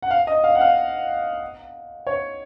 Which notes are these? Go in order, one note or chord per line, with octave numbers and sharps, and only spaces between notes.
F#5
F5
D#5
F5
F#5
F5
C#5